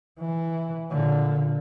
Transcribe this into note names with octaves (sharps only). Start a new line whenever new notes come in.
E3
A#2 D3